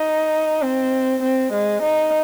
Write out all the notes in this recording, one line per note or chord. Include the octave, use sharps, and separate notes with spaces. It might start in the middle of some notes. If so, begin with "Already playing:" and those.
Already playing: D#4
C4
C4
G#3
D#4